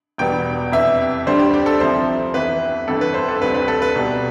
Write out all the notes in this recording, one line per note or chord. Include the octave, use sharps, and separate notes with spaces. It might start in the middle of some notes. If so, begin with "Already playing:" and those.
E1 E2 B2 G3 B3 G5
F2 C3 E3 E5
D2 D3 G3 D4 C5
G4
G4
A4
C2 C3 F3 C4 E4 C5
F2 E3 B3 E4 B4
G1 F2 C3 E3 A3 A4
B4
C5
A4
D2 C3 G3 C4 B4
B4
A4
B4
C2 B2 G3 B3